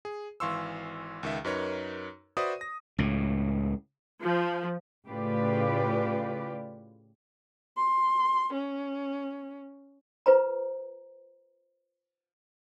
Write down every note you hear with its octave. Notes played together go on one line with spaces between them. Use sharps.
G#4
G#1 E3 F5 C6 C#6 E6
C#2 D#3 E5
F#2 D#4 A#4 B4 C#5
F#4 B4 C5 D5 E5 D#6
A#6
C#2 A2
F3
A2 C#3 F4 G4 B4 D5
C6
C#4
F4 B4 C5 A#5